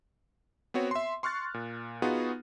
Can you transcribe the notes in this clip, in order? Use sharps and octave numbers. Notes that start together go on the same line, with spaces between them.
B3 C4 F#4 C#5
E5 C6
C6 C#6 F6 F#6 A6
A#2
B3 D#4 F4 F#4 G#4